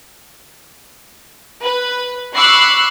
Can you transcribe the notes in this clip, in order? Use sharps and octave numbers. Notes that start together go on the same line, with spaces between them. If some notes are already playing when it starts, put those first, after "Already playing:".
B4
B5 C#6 D6 E6 F#6 C7